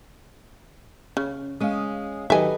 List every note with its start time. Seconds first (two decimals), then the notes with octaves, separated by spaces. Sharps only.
1.17 C#3 C#4
1.60 G#3 C#4 F5 D#6
2.30 D#3 F#3 G4 A4 B4 D#5 E5 G#5